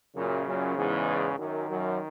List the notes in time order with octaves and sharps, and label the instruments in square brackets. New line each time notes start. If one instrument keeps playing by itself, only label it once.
[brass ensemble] F#2 A#2 [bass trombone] C#3
[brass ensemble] F#2 A#2
E2 G#2
[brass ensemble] F#2 [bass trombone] D#3
[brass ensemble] F#2